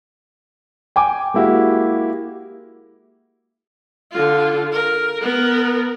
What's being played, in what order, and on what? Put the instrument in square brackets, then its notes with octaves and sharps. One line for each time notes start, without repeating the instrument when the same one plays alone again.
[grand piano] G5 G#5 D6
G#3 A#3 E4 F#4 G4
[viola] D3 F4
A#4
B3 A#4